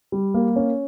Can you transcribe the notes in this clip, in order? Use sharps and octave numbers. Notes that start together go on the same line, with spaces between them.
G3
A#3
C#4